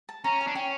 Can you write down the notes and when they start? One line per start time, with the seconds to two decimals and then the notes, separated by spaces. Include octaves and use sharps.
0.09 A5
0.24 C#4 A#5
0.41 G#5
0.47 D4
0.55 C#4 G5